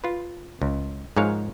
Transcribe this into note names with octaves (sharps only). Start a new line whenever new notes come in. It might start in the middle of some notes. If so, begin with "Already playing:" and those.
F4 B4
C#2
G#2 F3 G#3 A#4 C#5 F5